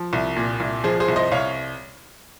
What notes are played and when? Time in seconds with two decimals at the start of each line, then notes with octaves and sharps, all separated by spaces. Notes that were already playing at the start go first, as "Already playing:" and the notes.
Already playing: F3
0.13 C2
0.36 A#2
0.60 C2
0.84 F3 G#4 C5
1.00 G#4 C5
1.08 C2
1.16 C5 D#5
1.32 C2 C#5 F5